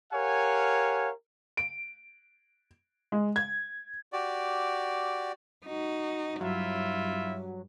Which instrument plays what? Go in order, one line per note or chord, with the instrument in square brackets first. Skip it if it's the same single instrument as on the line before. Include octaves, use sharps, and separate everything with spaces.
[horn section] G4 A#4 C#5 F5 F#5 G#5
[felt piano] D7
G#3
G#6
[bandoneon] F#4 G4 D5
[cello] D#4 F#4
[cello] G2 [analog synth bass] F#3 [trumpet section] E4 F4 E5